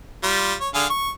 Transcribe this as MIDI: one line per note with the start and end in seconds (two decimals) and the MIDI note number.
0.23 0.54 55
0.23 0.54 65
0.60 0.69 73
0.74 0.85 50
0.74 0.85 68
0.74 0.85 77
0.90 1.10 85